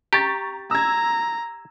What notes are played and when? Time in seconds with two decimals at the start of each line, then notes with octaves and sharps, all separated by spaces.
0.13 G4 A#5 C#6 A6
0.71 A#5 E6 G#6